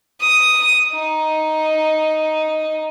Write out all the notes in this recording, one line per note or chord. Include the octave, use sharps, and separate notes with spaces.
D#6
D#4